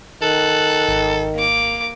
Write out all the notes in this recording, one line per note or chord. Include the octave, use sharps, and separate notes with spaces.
D#3 A4 F#6
G#1
A#3 D6